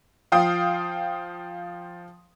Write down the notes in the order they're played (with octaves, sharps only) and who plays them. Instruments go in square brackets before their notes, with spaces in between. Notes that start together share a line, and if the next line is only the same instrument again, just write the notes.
[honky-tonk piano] F3 F5 G5 D#6